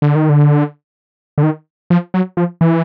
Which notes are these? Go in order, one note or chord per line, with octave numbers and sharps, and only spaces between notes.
D3
D#3
D3
D3
D#3
F3
F#3
F3
E3